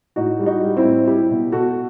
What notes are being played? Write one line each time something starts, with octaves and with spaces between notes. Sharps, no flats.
A2 D#4 F#4
G3
D#4 F#4
G3
C4 E4
A2
G3 E4 G4
B2
B2 F#4 A4